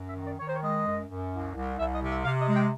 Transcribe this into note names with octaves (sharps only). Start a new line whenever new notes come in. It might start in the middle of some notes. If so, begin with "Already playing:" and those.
Already playing: F#2
E5
D#3
D5
D#3 C#5
C5
C#5
G#3 D#5
F#2
F#2
C2
C2
C2 E5
D#5
C3
E5
C3 F5
D#5
G#3
G5